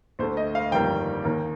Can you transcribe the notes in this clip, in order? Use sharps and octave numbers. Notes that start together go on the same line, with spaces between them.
D2 D3 A3 C5
D#5
F5
G1 F2 D#3 G3 A#3 G5
D#2 D#3 A#3